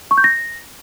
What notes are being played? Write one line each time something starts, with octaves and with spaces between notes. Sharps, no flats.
C#6
G6
A#6